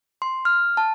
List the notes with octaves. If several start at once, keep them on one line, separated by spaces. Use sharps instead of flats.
C6
F6
A5